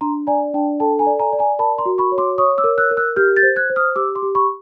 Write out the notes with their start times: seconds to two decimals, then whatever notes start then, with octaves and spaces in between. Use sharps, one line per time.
0.01 D4 A#5 C6
0.27 D5 G#5 A#5
0.54 D4 G5 A5
0.79 A4 G5 A5
0.99 G#5 A#5
1.06 D5
1.20 G#5 A#5
1.33 D5
1.39 G#5 A#5
1.59 A#4 A5 B5
1.78 A#5 C6
1.86 F#4
1.98 B5 C#6
2.12 C#5
2.18 C6 D6
2.38 C#5 C#6 D#6
2.58 D6 E6
2.64 A#4
2.78 E6 F#6
2.91 A#4
2.97 E6 F#6
3.16 G4 F6 G6
3.36 G6 A6
3.43 C5
3.56 F#6 G#6
3.70 C5
3.76 D#6 F6
3.96 G4 D6 E6
4.15 C6 D6
4.22 G4
4.35 B5 C#6